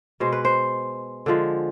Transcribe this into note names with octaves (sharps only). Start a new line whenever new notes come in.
B2 G#3 C5
B4
C5
D3 F3 G#3